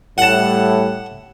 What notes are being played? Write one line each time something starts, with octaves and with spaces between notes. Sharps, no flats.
A2 G3 F#5 A5